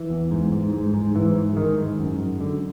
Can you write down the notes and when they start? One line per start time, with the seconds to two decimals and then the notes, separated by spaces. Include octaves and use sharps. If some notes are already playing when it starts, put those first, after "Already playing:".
Already playing: E3
0.10 E2
0.31 G#2
0.52 G#2
0.74 G#2
0.94 G#2
1.15 G#2 E3
1.35 G#2
1.57 G#2 D#3
1.78 G#2
2.00 F#2
2.21 F#2
2.41 D3